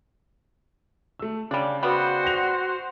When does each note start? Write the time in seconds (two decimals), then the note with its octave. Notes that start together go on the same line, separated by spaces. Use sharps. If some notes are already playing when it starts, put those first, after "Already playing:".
1.19 A3 E6
1.51 C#3 G3 C#4 D4
1.83 G3 B3 F#4 C5
2.23 G5 A#6 F7